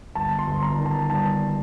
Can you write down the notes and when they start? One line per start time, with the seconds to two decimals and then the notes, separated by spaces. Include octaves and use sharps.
0.15 G1 A5
0.39 C6
0.47 G1
0.62 A#5
0.78 D#3
0.86 A5
1.10 G2 A5